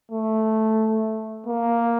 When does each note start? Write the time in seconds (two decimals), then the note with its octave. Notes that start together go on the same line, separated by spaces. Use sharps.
0.12 A3
1.47 A#3